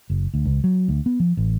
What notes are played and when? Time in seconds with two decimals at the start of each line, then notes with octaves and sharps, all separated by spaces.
0.10 F#1
0.34 D2
0.45 C#2
0.64 F#3
0.88 D2
1.06 B3
1.20 F3
1.37 A1